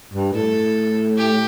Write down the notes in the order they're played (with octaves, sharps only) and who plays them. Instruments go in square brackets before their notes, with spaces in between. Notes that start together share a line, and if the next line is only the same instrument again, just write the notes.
[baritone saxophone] G2
[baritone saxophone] A2 [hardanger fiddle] A4
[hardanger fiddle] G4